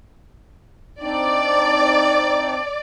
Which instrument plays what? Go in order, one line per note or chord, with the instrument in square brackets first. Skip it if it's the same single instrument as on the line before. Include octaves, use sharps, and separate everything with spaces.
[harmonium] C4 D4 D#4 [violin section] D5